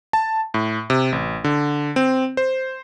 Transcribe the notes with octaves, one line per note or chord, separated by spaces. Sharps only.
A5
A2
C3
A1
D3
C4
C5